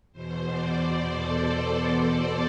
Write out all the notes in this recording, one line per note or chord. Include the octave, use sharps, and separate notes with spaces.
E2 B2 C5
D5
C5
A4